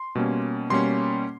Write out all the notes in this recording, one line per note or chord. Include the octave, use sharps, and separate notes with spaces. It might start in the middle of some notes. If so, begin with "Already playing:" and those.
Already playing: C6
B2 G3 A#3 C#4
B2 G3 A#3 C#4 C6